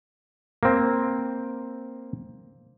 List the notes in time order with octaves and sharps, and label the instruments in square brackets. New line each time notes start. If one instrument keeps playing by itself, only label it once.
[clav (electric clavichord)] A#3 C4